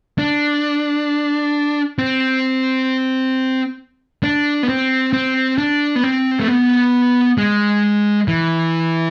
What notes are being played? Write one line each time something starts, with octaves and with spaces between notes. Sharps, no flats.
D4
C4
D4
B3
C4
C4
D4
B3
C4
A3
B3
G#3
E3